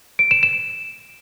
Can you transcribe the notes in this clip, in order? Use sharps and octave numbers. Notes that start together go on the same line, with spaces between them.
D7
E7
E7